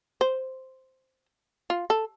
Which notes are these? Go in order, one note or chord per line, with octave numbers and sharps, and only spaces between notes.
C5
F4
A4